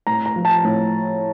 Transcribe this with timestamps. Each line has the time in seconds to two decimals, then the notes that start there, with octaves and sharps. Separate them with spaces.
0.07 A2 A#5
0.26 A#5
0.36 F3
0.45 A5
0.64 A2